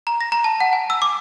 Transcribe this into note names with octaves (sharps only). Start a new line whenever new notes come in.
A#5
A#6
A#5
A5
F#5
G#5
E6
D6